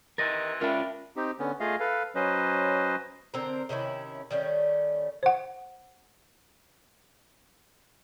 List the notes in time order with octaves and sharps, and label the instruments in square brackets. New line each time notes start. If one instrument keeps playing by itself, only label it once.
[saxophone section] C3 E3 [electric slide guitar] A#4 D#5 [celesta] A6 A#6
[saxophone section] B3 D4 [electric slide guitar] C#4 F4 [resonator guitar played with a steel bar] A#4 E5 G5
[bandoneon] C4 D#4 G4
D3 B3 C#4
A3 F4 G#4 D#5 F5
A4 B4 F5
F#3 C#4 B4 C5 D#5
[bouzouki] D3 C4 A#4
C3 D#3 C#4 E4
D#3 G3 A3 C#4
[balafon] C5 F#5